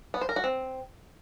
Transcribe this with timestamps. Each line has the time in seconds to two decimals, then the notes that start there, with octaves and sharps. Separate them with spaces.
0.14 B3
0.21 C5
0.29 A#4
0.36 F#4
0.44 C4